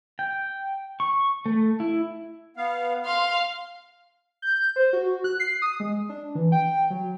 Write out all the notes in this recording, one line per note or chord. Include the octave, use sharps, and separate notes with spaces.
G5
C#6
A3
E4
B3 F5
F5 C6
G6
C5
F#4
F#6
C7
D#6
G#3
D4
E3
G5
F#3